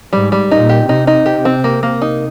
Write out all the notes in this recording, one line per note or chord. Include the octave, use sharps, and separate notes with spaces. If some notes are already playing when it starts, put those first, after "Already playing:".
G#2 G3
G3
A#2 D#4
G4
C3 D#4
D#4
G4
C4
A#3
A#3
D#4